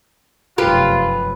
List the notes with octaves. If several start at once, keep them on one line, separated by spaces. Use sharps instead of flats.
F1 F#2 F4 G4 B4